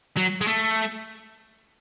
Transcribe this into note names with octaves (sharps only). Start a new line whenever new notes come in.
F#3
G#3
A3